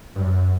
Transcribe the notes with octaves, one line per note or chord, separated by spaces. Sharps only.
G2
F#2